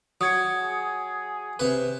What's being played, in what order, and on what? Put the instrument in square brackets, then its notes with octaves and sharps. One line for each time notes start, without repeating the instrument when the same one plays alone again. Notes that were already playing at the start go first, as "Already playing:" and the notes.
[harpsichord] F#3 [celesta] D#6 G#6 C#7
[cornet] G#4
[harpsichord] C3 B4